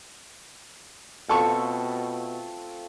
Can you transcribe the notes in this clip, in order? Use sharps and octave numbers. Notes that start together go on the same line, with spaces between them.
B2 A3 C4 F4 A4 C#6